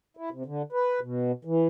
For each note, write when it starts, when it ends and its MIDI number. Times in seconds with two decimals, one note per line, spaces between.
0.17 0.29 64
0.32 0.43 48
0.46 0.62 50
0.73 1.00 71
1.01 1.32 47
1.45 1.67 52